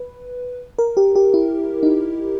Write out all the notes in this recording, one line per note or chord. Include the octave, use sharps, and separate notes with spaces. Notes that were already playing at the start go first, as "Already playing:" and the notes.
Already playing: B4
A#4
G4
G4
E4
D#4